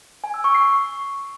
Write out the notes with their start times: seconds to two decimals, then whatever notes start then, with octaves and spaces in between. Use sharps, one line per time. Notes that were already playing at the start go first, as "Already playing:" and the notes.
0.24 G#5
0.34 E6
0.44 C#6
0.55 C7